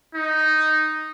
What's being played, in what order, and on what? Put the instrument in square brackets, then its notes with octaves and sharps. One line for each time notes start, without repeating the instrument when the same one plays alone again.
[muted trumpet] D#4